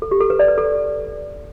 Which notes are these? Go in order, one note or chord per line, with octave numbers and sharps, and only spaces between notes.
A4
G4
A4
B4
D5
B4
A4